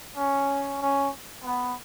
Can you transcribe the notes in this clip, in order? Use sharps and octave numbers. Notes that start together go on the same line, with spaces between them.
C#4
C#4
B3